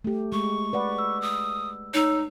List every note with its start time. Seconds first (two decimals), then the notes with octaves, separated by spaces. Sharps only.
0.04 A3 G4
0.32 G#3 C#6
0.73 B4 D5 F#5
0.98 E6
1.22 D#6
1.94 D#4 C#5 E6